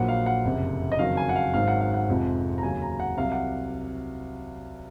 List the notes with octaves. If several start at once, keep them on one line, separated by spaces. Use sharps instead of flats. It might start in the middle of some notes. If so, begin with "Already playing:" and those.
Already playing: A#1 A#2 F#3 F#5
F5
F#5
F#1 F2 C3
D#5
F#1 F2 D#3 F#3 F5
G#5
F#5
F5
G#1 G#2 F#3 F5
F#5
F5
F#5
F1 F2 C3 F3 G#3
A#5
D#2 C#3 F#3 G#5
A#5
F#5
C2 C3 F#3 F5
F#5